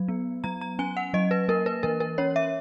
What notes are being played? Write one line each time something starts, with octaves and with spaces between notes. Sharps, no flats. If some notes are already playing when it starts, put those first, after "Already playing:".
Already playing: F#3
B3
F#3 A#5
A#5
C#4 G#5
F#5
F#3 D#5
B4
A#3 A#4
B4
E3 A#4
A#4
C#4 C#5
E5